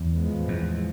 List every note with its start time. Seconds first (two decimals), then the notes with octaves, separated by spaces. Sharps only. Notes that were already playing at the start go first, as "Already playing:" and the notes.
Already playing: E2
0.12 A2 F3 G#3 B3
0.48 E2